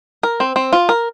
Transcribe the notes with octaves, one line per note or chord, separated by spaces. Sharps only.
A#4
C4
C4
F4
A#4